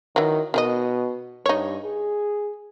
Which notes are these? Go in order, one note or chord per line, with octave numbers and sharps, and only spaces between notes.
D#3 E3 F#3
B2 D#3 G#4 D#5
G2 D#4 C#5
G#4